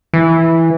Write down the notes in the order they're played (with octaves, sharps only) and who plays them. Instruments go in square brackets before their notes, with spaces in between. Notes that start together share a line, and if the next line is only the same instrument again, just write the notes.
[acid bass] E3